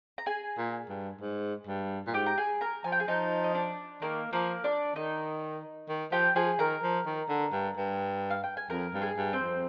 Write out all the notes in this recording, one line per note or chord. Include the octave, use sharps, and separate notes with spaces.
A#5
G#4 G#5
A#2
G2
G#2
G2
A#2
G#2 G4 G5
A#5
G#4 G#5
A#4 A#5
F3 G#5
G5
G#4 G#5
F3 D#4 D#5
D#5
D4 D5
D#3 A#3 A#4
F3 A#3 A#4
D4 D5
D#3 D#4 D#5
D#3
F3 G4 G5
F3 G#4 G#5
D#3 A#4 A#5
F3
D#3
D3
G2
G2
F5
G5
G#5
F2 A#4 A#5
G2
G#4 G#5
G2
C4 C5
F2